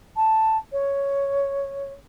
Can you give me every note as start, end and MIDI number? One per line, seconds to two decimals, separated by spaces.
0.16 0.57 81
0.72 1.93 73